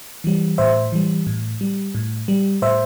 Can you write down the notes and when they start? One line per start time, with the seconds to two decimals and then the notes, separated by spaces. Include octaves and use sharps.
0.24 E3 G3
0.58 A2 C5 E5
0.92 E3 G3
1.27 A2
1.61 G3
1.95 A2
2.28 G3
2.62 A2 C5 E5